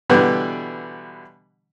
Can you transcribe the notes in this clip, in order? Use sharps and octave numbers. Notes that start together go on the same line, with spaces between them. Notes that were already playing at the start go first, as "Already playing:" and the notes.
B2 D3 E3 G3 B3